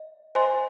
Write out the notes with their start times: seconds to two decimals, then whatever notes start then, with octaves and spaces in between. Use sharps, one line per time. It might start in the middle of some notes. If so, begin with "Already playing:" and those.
Already playing: D#5
0.35 C5 D#5 G#5 C6